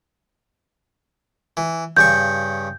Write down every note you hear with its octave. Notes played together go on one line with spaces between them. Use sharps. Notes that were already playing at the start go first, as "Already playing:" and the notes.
E3
G2 C#3 C#6 G6